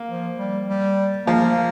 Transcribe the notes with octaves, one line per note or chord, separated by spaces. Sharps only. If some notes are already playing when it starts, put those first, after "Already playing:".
Already playing: A#3
F3
G3
G3
F3 A#3